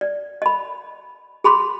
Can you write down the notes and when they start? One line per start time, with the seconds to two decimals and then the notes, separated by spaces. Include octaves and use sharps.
0.01 D5
0.42 D#5 B5
1.44 G#4 B5 C6 D6